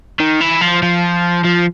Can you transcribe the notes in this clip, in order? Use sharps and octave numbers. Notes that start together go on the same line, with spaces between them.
D#3
E3
F3
F3
F3